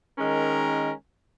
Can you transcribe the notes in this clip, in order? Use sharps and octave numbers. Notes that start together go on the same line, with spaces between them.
D#3 G#3 C#4 A#4